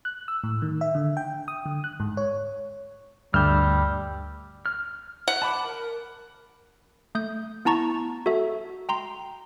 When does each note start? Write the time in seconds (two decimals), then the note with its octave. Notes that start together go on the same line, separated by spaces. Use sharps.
0.05 F#6
0.28 E6
0.44 A2
0.62 D#3
0.81 E5
0.95 D3
1.17 G5
1.48 D#6
1.66 D3
1.84 F#6
2.00 G#2
2.17 C#5
3.34 D2 G2 G3 E6 F6 G6
4.66 F6
5.28 F#5
5.42 A5 B5 D6
5.65 A#4
7.15 A3 D#6 G6
7.65 B3 E4 A5 A#5 C#6 A6
8.26 F#4 A4 E5
8.89 G5 A#5 C6